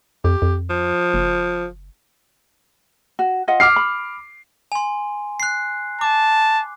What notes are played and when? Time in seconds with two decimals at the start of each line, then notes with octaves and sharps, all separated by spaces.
0.24 F2 G4
0.42 F2
0.70 F3
1.14 F#1
3.19 F#4
3.48 F4 D#5 F#5
3.60 D6 F6 C7
3.76 B5
4.72 G#5 C6
5.40 F#6 C7
6.01 A5 D6